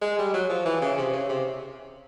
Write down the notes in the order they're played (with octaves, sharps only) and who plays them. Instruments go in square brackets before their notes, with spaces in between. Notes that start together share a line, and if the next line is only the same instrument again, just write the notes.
[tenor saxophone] G#3
G3
F#3
F3
E3
C#3
C3
C#3
C3